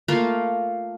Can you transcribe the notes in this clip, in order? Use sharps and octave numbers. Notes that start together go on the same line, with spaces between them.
A3 A#3 F4